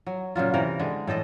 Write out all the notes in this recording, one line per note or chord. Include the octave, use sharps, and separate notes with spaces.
F#3
A#2 C#3 F#3 F4
C3 E3 A#4
D3 G#3
A2 E3 A4 D#5